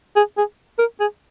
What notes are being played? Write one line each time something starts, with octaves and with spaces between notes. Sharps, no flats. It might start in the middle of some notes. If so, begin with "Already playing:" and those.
G#4
G#4
A#4
G#4